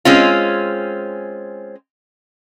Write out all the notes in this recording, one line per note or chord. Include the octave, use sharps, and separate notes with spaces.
G#3 C4 C#4 F4